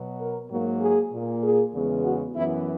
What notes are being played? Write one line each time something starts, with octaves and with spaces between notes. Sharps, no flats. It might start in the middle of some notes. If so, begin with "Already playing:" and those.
Already playing: B2 F#3 B3
A#4
G#2 F#3 A#3
G#4
A#2 A#3
G#4
E2 C#3 G#3 B3
F#4
F#2 E3 B3 E4